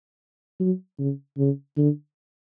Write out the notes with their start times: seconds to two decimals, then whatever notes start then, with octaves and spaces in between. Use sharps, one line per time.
0.60 F#3
0.99 C#3
1.38 C#3
1.77 D3